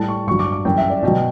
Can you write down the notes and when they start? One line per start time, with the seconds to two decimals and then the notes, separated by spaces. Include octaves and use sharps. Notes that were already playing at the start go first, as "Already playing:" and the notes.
Already playing: A2 G3 A5
0.09 C#6
0.27 G2 F#3 C#6
0.39 D6
0.52 D6
0.65 F#2 E3 G3 G5
0.78 E5
0.90 D5
1.03 B2 F#3 G5